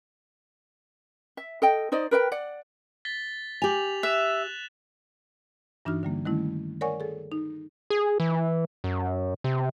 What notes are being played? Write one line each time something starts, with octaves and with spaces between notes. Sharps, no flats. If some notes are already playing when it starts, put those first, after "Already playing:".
E5
A4 D#5 G5
D#4 C5 D5 D#5
A#4 B4 E5 G5
D5 F#5
A6 B6 G7
G4 G#5 F7 F#7
E5 F#6 E7 F7
G2 E3 D4 D#4 F#4 F6
D3 G3 A#3
D#3 G3 A3 C#4 E4
A#4 C#5 D5 F#5 G#5 C#6
G#4 A4
D#4
G#4
E3
F#2
C3